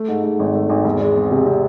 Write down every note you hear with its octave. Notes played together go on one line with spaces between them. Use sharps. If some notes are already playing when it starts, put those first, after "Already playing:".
Already playing: A3
G#2
G#2
G#1
A3
G#1
E2
G#3
C4
C3
C3